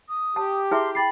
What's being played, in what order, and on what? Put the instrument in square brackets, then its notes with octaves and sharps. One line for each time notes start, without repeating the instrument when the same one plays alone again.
[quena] D#6
[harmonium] G4 [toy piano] A5
[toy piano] E4 G#4 E5 [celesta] A5 F6 [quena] C6
[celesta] G5 A6 C7 [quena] B5